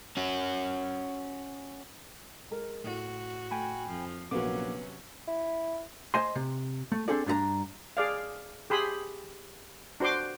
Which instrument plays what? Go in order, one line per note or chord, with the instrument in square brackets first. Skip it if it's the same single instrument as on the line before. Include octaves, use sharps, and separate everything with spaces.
[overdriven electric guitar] C#4 F#4
[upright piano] G#3 A#4
[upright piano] A2 [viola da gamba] F#4
[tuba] A3 [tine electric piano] G5 G#5 B5
[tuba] F2 [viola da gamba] F3
[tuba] A#1 [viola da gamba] C3 F#3 C#4 [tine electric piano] A#3 D6 [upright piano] B3 F#4
[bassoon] E4
[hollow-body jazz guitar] C5 D#5 G#5 C6
C3
A3
C4 D4 G#4 A4 D5
G2 D4 G#4 A#5
[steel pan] G#4 D5 F5
G4 G#4 B5 C6 D#6
D4 F#4 C5 C6 D6